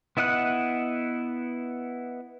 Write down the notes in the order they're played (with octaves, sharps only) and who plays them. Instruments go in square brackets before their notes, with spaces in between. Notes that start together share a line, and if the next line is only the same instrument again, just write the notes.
[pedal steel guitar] B3 E4 D#5 F#5 F#6